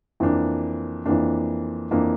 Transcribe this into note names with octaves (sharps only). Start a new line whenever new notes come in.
F2 E3 A#3 D4
F2 E3 A#3 D4
F2 E3 A#3 D4